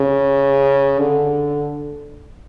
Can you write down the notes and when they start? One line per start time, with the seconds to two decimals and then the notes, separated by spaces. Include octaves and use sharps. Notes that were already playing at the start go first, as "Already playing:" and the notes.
Already playing: C#3
0.99 D3